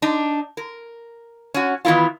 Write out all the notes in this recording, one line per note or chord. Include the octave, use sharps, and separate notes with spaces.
D4 D#4
A#4
C#4 F#4
D#3 E3 B3 E4 F4